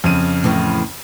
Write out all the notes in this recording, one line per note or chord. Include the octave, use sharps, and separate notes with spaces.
F2 C#3 D#7
A2 E3